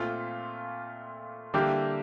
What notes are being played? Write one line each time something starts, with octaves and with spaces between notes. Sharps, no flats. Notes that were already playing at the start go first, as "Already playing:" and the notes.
Already playing: A#2 A3 C4 F4
D3 G3 A#3 E4 G4